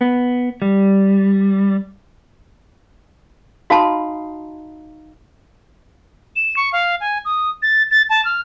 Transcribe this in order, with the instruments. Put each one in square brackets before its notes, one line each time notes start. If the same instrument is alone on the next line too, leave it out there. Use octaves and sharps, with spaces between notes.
[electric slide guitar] B3
G3
[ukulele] D#4 F5 B5 [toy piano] F#4 A5 C6
[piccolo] E7
C#6
F5
G#5
D#6
A6
A6
A5
F6